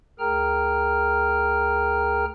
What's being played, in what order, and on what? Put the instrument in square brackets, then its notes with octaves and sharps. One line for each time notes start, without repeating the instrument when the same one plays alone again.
[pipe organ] D2 G#4 A#4 G5 A#5 F6